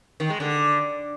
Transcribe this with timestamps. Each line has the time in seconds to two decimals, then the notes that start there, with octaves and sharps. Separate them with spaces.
0.20 D#3
0.30 G#3
0.40 D3